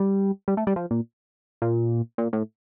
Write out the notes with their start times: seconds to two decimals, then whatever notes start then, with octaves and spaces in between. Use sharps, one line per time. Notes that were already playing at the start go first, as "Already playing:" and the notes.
Already playing: G3
0.48 G3
0.57 A3
0.67 G3
0.76 F3
0.91 A#2
1.62 A#2
2.18 A#2
2.33 A2